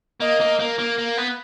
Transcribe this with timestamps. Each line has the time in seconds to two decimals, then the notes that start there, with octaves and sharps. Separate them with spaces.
0.20 A#3 D#5
0.40 A#3
0.59 A#3
0.79 A#3
0.98 A#3
1.17 B3